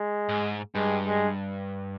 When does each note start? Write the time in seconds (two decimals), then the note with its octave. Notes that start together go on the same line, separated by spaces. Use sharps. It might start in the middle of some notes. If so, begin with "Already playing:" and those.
Already playing: G#3
0.29 G#2
0.75 G2 G#3
1.06 G#3